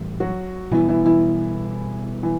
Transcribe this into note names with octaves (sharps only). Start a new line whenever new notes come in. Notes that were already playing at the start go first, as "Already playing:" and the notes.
Already playing: A2 E3 G3
F#3 F#4
B2 E3 G3 B3 E4
E3 E4
E3 E4
E3